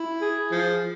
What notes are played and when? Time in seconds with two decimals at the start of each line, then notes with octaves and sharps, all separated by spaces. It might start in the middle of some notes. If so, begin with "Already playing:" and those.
Already playing: E4
0.22 G#4
0.52 F3